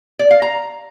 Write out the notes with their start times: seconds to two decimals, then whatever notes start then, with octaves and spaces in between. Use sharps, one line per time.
0.19 D5
0.31 F5
0.42 A#5